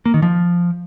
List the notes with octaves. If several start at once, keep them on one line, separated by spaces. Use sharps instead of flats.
A#3
D#3
F3